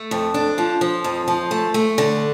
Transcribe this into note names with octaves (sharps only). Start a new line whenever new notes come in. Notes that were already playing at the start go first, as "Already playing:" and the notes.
Already playing: A3
F2
D4
F3
F3
F2
F3
A3
A3
D3